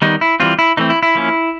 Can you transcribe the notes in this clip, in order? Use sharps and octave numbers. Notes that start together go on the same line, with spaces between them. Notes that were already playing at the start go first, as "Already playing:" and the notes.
D#3 G3 B3 D#4
E4
E3 G3 C4 F4
E4
E3 A3 C4 D#4
E4
E4
F3 A#3 C#4